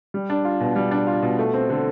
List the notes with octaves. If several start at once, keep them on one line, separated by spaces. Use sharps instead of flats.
G3
D4
F4
B2
G3
D4
F4
B2
A3
C4
D3